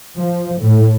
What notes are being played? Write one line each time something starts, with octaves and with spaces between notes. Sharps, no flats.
F3
A2